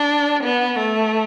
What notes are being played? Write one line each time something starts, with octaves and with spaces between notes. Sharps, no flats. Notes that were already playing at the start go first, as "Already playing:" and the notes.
Already playing: D4
B3
A3